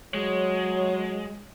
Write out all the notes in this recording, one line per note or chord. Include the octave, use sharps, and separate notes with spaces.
F#3 G#3 C#5